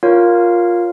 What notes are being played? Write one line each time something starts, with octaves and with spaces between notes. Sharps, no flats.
F4 A#4 C#5 F5